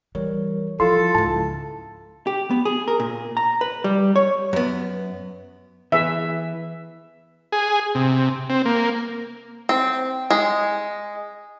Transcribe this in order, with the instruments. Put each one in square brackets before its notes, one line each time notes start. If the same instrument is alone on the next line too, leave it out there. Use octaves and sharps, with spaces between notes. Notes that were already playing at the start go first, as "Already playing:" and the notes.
[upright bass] E3 [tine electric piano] G3 A#4 C#5
[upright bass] F3 [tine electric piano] E4 F4 F5 [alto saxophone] A4 [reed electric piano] C6
[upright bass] C#2 G#2 [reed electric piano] A5
[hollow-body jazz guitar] G4
B3
G#4
A#4
A#2
A#5
B4
G3
C#5
F#2 B3
[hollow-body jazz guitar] E3 B3 G#4 [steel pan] E5
[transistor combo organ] G#4
C3
C4
A#3
[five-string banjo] C4
G#3